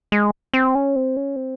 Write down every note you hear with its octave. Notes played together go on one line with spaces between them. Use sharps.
G#3
C4
C#4
C4
C#4
C4